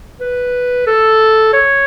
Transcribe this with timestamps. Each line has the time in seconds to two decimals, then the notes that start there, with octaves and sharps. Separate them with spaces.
0.20 B4
0.86 A4
1.53 C#5